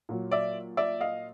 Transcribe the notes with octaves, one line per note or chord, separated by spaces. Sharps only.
A#2 F#3
D5 E5
D5 E5
D#5 F5